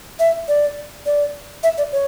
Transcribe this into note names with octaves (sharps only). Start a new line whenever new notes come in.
E5
D5
D5
E5
D5
C#5